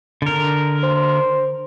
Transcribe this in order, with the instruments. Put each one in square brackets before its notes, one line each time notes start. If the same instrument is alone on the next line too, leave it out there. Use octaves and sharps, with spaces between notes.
[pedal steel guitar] D3 A#4
[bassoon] C5